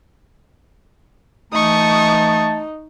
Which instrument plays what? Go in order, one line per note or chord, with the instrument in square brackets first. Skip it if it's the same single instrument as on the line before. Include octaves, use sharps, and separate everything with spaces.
[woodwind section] E3 A3 [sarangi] D#4 [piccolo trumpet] A5 [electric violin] C#6 D#6